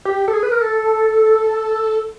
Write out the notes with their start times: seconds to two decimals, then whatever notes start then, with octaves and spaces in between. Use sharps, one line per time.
0.05 G4
0.28 A4
0.33 G#4
0.43 B4
0.52 A#4
0.61 A4